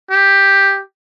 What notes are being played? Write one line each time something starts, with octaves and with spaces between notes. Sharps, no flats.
G4